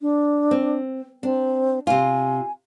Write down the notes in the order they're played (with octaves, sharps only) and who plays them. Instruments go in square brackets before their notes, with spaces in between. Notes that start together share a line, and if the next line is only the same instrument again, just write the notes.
[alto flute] D4
[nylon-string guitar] C4
[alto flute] C4 [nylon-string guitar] D4
[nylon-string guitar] C3 F4 [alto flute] G#5